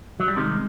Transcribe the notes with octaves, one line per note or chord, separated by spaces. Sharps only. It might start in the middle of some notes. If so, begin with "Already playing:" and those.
F#3
G3
C2 C3 D#3 G#3